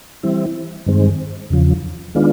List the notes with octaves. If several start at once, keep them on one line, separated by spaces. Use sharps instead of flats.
E3 G3 C4 E4
G2 D#3 G#3 C4
E2 C#3 F3
D#3 G#3 B3 D4 F4